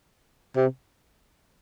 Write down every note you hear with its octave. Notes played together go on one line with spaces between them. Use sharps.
C3